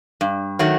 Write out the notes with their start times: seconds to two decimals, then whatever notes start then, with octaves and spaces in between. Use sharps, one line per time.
0.21 G2
0.59 D#3 F#3 A3